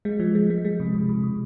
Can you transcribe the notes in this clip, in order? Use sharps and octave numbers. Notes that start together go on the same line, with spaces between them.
G#3
F3
G#3
G#3
G#3
C3
C3
C3
C3